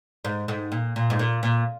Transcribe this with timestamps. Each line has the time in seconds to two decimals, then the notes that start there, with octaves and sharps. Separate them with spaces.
0.25 G#2
0.48 G#2
0.72 A#2
0.96 A#2
1.10 G#2
1.19 A#2
1.43 A#2